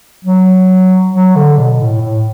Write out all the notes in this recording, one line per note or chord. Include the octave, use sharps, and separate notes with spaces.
F#3
F#3
D3
B2
A2
A2